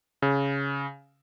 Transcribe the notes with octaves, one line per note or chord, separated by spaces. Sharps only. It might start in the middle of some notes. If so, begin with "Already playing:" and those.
C#3